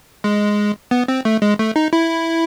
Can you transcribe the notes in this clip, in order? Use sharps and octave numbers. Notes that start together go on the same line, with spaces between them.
G#3
B3
C4
A3
G#3
A3
D#4
E4